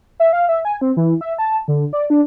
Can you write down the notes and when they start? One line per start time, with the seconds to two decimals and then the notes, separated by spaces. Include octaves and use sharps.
0.20 E5
0.33 F5
0.49 E5
0.65 G#5
0.81 C4
0.97 E3
1.21 E5
1.38 A5
1.68 D3
1.93 D5
2.10 D4